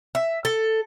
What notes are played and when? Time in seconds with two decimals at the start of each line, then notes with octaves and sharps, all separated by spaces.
0.15 E5
0.45 A4